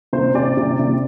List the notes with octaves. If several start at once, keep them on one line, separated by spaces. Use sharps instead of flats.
C3 C5
C3 D5
C3
C3